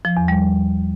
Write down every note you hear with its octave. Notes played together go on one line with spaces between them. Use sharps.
F3
E2
G3